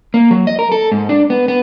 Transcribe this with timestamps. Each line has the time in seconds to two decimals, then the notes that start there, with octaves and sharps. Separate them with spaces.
0.14 A#3
0.31 F#3
0.47 D#5
0.59 A#4
0.72 A4
0.92 G#2
1.09 D4
1.30 B3
1.48 B3